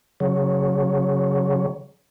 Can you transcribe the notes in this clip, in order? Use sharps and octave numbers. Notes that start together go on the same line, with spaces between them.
C#3 F#3